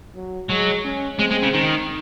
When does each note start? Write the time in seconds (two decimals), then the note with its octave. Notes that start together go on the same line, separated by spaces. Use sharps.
0.15 F#3
0.50 F#3 G#3
0.85 C#4
1.19 G#3 C4
1.30 G#3
1.42 C#3
1.54 D#3